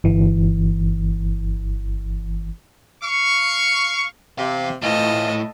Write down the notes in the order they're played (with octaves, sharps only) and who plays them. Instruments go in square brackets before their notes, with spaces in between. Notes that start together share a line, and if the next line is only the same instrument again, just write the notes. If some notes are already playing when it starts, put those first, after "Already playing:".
[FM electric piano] G1 E3
[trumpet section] F5 C#6
[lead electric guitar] E2 F5 [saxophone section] C3
[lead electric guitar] A2 A3 [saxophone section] E3 C4 F4 [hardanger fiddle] A4 D#5